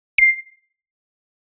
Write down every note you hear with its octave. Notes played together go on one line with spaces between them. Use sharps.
C7